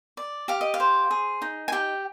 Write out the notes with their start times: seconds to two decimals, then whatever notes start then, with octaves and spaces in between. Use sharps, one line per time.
0.17 D5
0.48 G4 F5
0.61 D#5
0.74 F5
0.80 C5
1.11 G#4
1.42 D#4
1.68 G#5
1.72 G4 G5